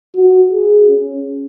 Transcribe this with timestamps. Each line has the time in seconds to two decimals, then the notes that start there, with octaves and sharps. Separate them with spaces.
0.16 F#4
0.52 G#4
0.88 C#4